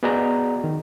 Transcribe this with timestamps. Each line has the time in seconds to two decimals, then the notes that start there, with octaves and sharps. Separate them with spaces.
0.03 B3 F#4 G#4 D5 D#5 A#5
0.64 D#3